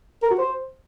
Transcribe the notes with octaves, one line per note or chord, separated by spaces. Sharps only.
A#4
F#4
C5